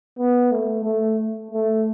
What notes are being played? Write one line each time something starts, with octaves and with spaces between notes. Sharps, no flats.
B3
A3
A3
A3